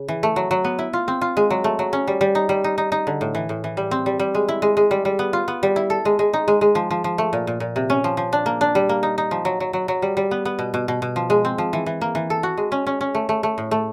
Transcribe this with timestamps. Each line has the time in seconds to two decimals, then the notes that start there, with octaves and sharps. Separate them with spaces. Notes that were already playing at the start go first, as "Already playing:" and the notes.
Already playing: C#3
0.08 E3
0.23 A3
0.36 F#3
0.51 F#3
0.64 B3
0.79 E4
0.93 F4
1.08 C4
1.21 F4
1.37 G#3
1.50 F#3
1.64 A3
1.79 F#3
1.93 C#4
2.08 G3
2.21 G3
2.35 D#4
2.49 G3
2.64 D#4
2.78 D#4
2.92 D#4
3.07 D3
3.21 A2
3.35 E3
3.49 A2
3.64 E3
3.77 G3
3.91 C4
4.06 G3
4.19 G3
4.35 G#3
4.48 E4
4.62 G#3
4.77 G#3
4.91 G3
5.05 G3
5.19 B3
5.33 F4
5.48 B3
5.63 G3
5.76 E4
5.90 A4
6.05 G#3
6.19 G#3
6.33 D#4
6.48 G#3
6.61 G#3
6.75 F3
6.91 F3
7.04 F3
7.18 A3
7.33 A#2
7.47 A#2
7.60 A#2
7.76 C3
7.90 C#4
8.04 F3
8.17 F3
8.33 D4
8.46 A#3
8.61 D4
8.75 G3
8.89 A#3
9.03 D#4
9.18 D#4
9.31 F3
9.45 F#3
9.60 F#3
9.73 F#3
9.88 F#3
10.02 G3
10.17 G3
10.31 B3
10.45 B3
10.59 B2
10.74 B2
10.88 B2
11.02 B2
11.16 F3
11.30 G#3
11.45 C4
11.58 F3
11.73 E3
11.86 E3
12.01 A#3
12.15 E3
12.30 A4
12.43 F#4
12.57 G#3
12.72 C#4
12.87 C#4
13.01 C#4
13.15 A3
13.29 A3
13.43 A3
13.58 A2
13.71 A3